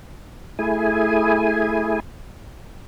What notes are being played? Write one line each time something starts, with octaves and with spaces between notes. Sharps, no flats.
A3 E4 G#4 G#5